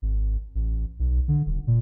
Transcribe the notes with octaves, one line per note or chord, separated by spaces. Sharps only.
G#1
A1
B1
D3
D#1
A#2